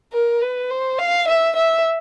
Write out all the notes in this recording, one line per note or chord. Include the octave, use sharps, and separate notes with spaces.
A#4
B4
C5
F5
E5
E5